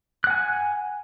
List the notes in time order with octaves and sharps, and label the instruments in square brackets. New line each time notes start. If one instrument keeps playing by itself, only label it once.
[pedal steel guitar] F#6
F#5
G#5